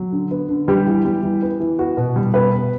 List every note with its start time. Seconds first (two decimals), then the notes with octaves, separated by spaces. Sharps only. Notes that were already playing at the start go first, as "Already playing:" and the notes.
Already playing: F#3
0.12 D3
0.31 B3
0.49 D3
0.68 G3 B3 G4
0.86 E3
1.05 G3
1.23 E3
1.42 B3
1.60 E3
1.79 B3 F#4
1.97 B2
2.16 G3
2.34 B2 B3 B4
2.52 B3